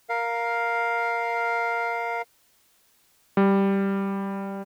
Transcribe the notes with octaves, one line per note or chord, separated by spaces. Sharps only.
A#4 F5
G3